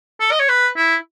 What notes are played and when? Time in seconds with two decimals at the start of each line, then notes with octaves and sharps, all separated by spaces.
0.20 A4
0.31 D#5
0.40 C#5
0.49 B4
0.76 E4